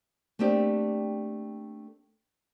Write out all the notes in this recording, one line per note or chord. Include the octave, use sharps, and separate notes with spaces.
A3 A#3 C4 D4 G4